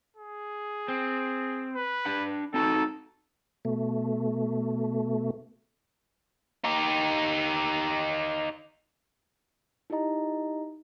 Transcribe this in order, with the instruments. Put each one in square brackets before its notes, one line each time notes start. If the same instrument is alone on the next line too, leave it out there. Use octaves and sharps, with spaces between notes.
[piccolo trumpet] G#4
[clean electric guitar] C4
[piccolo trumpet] B4
[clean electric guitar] D4 B5
[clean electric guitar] C4 D#4 F#4 [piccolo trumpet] A4
[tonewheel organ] B2 A3
[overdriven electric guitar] D#4 G4
[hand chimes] D#4 E4 G4 D#5 A#5